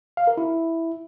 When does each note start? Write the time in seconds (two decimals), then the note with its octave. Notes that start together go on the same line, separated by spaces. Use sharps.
0.17 F5
0.27 A#4
0.37 E4